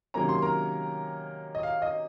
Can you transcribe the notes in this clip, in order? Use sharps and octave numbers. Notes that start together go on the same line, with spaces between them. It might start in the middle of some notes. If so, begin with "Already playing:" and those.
C3 D#3 F#3 A#3 C#4 A#5
C6
A#4 A#5
D#5
F5
D#5